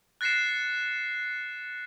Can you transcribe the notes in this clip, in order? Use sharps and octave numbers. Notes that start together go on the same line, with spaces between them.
F#6 A6 A#6 C7 C#7 E7